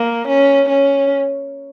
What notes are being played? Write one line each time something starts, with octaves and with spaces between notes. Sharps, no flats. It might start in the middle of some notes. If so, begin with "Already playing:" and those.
Already playing: A#3
C#4
C#4